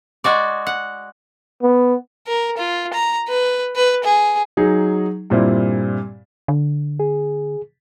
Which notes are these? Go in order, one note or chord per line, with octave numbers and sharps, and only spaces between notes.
G#3 F#4 D5
F#5
B3
A#4
F4
A#5
B4
B4
G#4
F#3 D#4 G#4
G2 A#2 C4 E4
D3
G#4